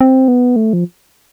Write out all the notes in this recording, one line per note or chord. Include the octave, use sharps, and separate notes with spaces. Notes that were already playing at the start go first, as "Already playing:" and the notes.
C4
B3
A3
F3